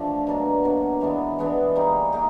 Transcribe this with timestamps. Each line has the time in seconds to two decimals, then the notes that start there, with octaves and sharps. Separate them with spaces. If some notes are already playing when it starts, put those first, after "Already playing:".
Already playing: D3 F3 A3 D4
0.27 B2 F#3 A#3 D4
0.64 B2 F#3 A#3 D4
1.01 E3 G#3 B3 D4
1.38 E3 G#3 B3 D4
1.75 G3 A#3 D#4 G#4
2.13 A#3 D#4 G#4